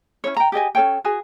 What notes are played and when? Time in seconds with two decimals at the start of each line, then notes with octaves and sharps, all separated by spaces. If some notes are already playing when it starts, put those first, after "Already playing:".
0.24 C#4 D#4 E4 C#5
0.37 G5 A#5
0.52 G4 G#4 D#5 G#5
0.75 C#4 A4 C#5 G5
1.04 F#4 G#4 G#5